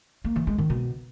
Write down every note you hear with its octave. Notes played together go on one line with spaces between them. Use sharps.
A#3
E3
G#3
D#3
B2